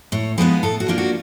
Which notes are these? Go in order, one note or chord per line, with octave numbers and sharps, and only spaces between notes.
A2 C#5
F3 G#3 B3 D#4 B4
A2 A4
F#4
F3 A#3 D4 F4
F#4